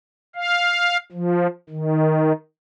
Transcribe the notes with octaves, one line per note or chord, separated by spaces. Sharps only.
F5
F3
D#3